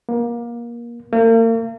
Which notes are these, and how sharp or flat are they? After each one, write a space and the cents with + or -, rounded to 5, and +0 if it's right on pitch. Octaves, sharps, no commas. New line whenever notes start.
A#3 +25
A#3 -40